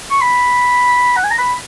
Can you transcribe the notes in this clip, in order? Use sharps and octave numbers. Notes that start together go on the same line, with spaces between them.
C#6
B5
F#5
G#5
A#5
B5